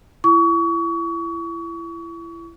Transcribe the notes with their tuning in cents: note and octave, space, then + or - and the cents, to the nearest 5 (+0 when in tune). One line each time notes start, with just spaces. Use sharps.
E4 +30 C#6 +30